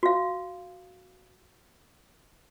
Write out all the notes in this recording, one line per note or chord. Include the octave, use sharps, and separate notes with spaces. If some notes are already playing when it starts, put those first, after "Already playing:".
F#4 F5